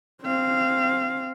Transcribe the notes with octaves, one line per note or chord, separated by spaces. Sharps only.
C4 F5